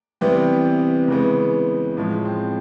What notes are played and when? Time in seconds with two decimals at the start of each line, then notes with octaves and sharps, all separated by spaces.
0.21 C3 E3 G3 B3 C4
1.08 C#3 E3 G#3 B3
1.97 A2 F3 G#3
2.25 C4